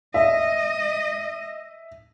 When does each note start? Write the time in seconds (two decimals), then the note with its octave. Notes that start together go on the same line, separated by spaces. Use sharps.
0.14 D#5 E5